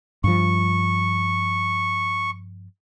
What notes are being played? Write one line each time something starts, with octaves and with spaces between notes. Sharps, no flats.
G2 F3 C#6